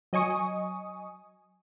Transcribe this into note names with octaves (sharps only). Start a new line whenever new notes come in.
F#3 D#5 G#5 C#6 D#6